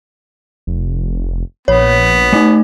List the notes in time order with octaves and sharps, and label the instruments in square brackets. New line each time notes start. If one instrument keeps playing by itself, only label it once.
[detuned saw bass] F1
[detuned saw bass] A#1 [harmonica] B3 [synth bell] C#5
[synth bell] A3 D#4